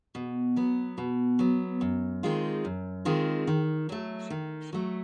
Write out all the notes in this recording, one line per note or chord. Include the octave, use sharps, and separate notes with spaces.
B2
F#3 B3
B2
F#3 B3
F#2
D#3 G#3 C4 F4
F#2
D#3 G#3 C4 F4
D#3
F#3 A3
D#3
F#3 A3